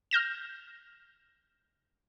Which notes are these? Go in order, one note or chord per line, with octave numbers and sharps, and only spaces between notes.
F6 G6 A#6 E7